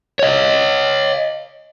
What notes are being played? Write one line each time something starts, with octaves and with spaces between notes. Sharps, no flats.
C#5 D#5